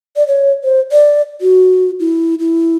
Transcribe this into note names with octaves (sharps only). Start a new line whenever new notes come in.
D5
C#5
C5
D5
F#4
E4
E4